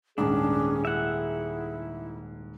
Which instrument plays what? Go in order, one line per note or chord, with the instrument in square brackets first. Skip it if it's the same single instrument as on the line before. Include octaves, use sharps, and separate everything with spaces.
[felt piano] D#1 G#2 [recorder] C#4 [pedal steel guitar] D4 [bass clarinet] G#4
[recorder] E4 [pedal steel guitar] E5 F#5